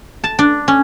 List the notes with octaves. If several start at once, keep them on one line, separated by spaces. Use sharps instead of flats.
A5
D4
C#4